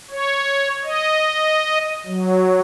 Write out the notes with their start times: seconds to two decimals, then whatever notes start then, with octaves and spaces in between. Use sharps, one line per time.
0.10 C#5
0.84 D#5
2.06 F#3